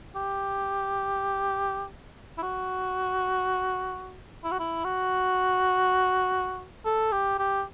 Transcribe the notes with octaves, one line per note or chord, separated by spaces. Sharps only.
G4
E4
F#4
E4
F#4
E4
F#4
A4
G4
G4